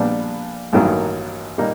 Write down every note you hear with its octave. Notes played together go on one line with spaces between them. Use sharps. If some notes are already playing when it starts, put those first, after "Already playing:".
Already playing: A#1 A#2 G3 B3 D4
A1 G2 D#3 F#3 A#3
A#2 G3 A#3 D#4